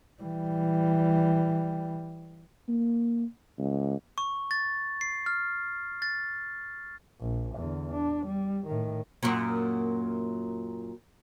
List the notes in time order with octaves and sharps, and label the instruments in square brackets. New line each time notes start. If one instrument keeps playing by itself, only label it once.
[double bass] E3 G3
[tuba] A#3
C#2
[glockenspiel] C#6
A6
C7
F6
A6
[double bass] A#1
E2 D3
D4
G3
A2 D#3
[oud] F#2 A#2